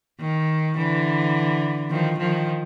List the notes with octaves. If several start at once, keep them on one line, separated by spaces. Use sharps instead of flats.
D#3
D3 E3
D#3 F3
D#3 F3